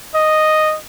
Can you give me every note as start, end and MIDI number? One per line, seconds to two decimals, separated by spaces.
0.15 0.76 75